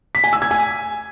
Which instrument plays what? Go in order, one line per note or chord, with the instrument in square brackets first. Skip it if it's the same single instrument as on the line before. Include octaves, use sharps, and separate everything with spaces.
[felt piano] B6
G#5
E6
G#6
G#5